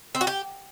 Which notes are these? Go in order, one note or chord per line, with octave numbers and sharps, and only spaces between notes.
C4
F#4
G4